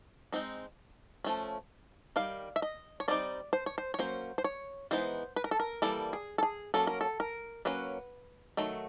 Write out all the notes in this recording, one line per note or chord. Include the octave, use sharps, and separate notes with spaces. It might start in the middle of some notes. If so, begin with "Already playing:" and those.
G#3 C4 D#4
F3 A3 C#4
D#3 G3 F5
E5
D#5
C#5
G3 C4 D#4 D5
C5
C#5
C5
C#5
F#3 A#3 C#4 C5
C5
C#5
E3 G#3 B3 D#4 C5
B4
A#4
A4
A#4
E3 G3 A#3 A4
G#4
A4
G#4
F#3 A#3 C#4 A4
A#4
A4
A#4
F#3 A#3 C#4 B4
D#3 F#3 A3